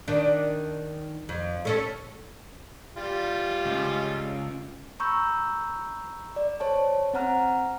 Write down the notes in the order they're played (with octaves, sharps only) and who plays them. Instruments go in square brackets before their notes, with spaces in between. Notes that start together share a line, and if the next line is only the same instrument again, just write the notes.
[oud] D#3 D4
F2
A3 C#4 A4
[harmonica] G3 F4
[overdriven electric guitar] C#2
[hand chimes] A#5 B5 C#6 E6 G6
D5
C5 C#5 A5
C4 C5 F#5 A#5 F6